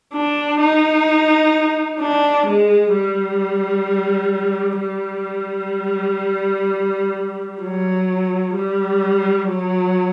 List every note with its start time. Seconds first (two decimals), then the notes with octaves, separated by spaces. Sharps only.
0.13 D4
0.60 D#4
2.01 D4
2.47 G#3
2.94 G3
4.81 G3
7.62 F#3
8.55 G3
9.49 F#3